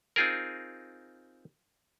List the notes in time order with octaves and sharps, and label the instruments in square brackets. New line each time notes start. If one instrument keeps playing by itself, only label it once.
[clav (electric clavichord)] C4 D#4 F4 G#4 A#4